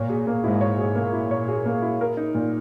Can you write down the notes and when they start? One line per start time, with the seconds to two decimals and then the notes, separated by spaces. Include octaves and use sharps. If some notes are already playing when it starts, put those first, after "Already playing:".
Already playing: A#2 C#5
0.10 G#4
0.27 A#3
0.44 G#2 E4
0.61 C#5
0.78 G#4
0.95 A#2 A#3
1.13 E4
1.31 C#5
1.48 G#4
1.66 A#3
1.82 E4
2.01 A#4
2.17 D#4
2.35 A#2